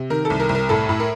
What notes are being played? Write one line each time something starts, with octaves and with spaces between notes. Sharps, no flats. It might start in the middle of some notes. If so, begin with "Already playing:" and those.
Already playing: C3
D#3 A#4
A4
C2
A#4
C2
A#4
A2 A4
A2
A#4